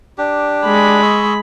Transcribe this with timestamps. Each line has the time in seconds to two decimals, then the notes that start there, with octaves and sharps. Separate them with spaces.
0.18 D4 G4
0.65 G#3 B5
1.02 D#5 C#6 E6